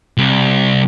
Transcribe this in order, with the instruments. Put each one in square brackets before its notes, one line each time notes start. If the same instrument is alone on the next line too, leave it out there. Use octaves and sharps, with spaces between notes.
[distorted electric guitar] C2